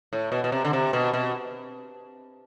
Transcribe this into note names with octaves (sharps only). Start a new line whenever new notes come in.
A2
B2
B2
C3
D3
C3
B2
B2